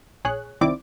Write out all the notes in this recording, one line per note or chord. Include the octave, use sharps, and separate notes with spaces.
A#1 G#4 C#5 F#6
C2 D#3 C4 E4 D5 D6